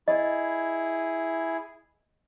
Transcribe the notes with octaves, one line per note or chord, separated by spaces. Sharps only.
E4 G#4 D#5